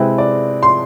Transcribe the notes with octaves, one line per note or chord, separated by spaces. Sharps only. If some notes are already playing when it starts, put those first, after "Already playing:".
Already playing: C3 G#3 C4 E4 B4
D5
C6